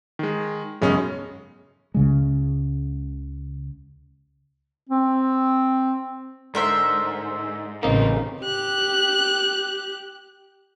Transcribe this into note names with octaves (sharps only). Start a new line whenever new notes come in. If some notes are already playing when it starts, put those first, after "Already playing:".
D#3 G#3
B1 F#2 C#3 G#3 C#4 D#6
C#2 C#3 G#3
C4
G#2 D3 A#4 C5 E5
A1 C#3 A#3 C4 D#4 A#4
G4 F#6